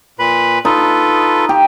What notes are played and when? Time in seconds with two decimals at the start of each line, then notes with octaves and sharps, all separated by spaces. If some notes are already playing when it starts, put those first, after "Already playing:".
0.19 A#2 B4 B5
0.65 D#4 F4 A4 B4
1.49 G4